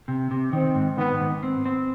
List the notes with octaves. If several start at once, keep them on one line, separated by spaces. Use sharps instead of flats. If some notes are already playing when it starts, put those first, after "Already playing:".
C3
C3
D#3 C4
G#2
D#3 B3
G#2
C4
C4